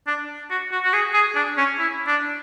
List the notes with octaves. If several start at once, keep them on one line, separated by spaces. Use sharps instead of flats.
D4
F#4
F#4
F#4
G#4
G#4
D4
C#4
E4
D4